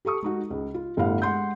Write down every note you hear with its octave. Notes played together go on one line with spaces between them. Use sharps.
G4 A4 C#6 D#6
G#3 D#4 F#4
C#2
F4
G1 A2 G4 F5 F#5
G#3 F#5 C6 G6